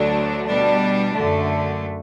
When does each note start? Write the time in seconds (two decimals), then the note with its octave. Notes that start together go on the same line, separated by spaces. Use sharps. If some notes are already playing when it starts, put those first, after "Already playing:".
Already playing: D2 D3 F#3 A3 D4
0.47 B2 G3 D4
1.14 F#2 D3 A3